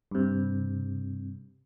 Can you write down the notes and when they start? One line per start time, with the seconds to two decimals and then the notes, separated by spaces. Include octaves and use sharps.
0.11 G2 C3